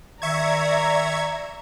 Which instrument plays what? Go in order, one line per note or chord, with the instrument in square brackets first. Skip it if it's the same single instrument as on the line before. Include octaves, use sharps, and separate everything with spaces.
[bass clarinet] D#3 [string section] D5 A#5 [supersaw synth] E5 C#6 G#6